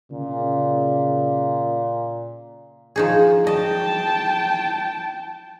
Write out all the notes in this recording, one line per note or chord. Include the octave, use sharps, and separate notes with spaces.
A#2 C#3
F3 D#4 G#4
D#5 G5 A5